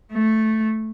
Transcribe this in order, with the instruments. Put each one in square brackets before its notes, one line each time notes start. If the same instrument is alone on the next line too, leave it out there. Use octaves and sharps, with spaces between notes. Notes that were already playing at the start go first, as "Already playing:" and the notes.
[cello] A3